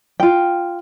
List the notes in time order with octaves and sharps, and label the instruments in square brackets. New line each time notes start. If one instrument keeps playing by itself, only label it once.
[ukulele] F4 G5